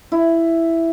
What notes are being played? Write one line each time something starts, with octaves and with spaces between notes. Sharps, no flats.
E4